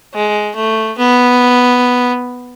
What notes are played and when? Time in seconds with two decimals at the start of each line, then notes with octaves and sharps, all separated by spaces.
0.14 G#3
0.56 A3
0.97 B3